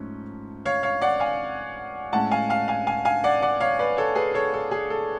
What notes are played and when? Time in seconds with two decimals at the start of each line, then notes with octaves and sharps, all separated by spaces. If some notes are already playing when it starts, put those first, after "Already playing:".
Already playing: G#2 F3 A3 C#4
0.65 C#5 F5
0.83 C#5 F5
1.01 D5 F#5
1.20 F5 G#5
2.13 A2 G#3 C#4 F#5 A5
2.31 F5 G#5
2.49 F5 G#5
2.68 F5 G#5
2.87 F5 G#5
3.05 F5 G#5
3.24 D5 F#5
3.42 D5 F#5
3.61 C#5 F5
3.79 B4 D5
3.97 A4 C#5
4.15 G#4 B4
4.34 A4 C#5
4.54 A4
4.71 G#4
4.90 A4